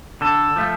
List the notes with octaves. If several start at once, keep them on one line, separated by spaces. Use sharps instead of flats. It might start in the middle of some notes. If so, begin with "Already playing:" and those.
D3 A4
F3 A3